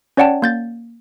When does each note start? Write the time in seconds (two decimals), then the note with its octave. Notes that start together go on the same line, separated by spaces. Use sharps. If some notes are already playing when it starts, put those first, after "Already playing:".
0.17 C#4 C#5 D5 F#5 G5 A5
0.42 A#3 G6 A6